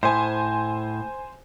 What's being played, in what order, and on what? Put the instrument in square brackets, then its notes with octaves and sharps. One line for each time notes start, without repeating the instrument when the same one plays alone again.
[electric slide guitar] A2 [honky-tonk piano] C5 G#5